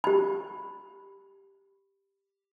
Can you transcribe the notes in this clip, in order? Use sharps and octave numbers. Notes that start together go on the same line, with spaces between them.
G4 B5